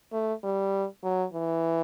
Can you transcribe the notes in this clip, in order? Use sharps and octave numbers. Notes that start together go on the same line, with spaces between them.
A3
G3
F#3
E3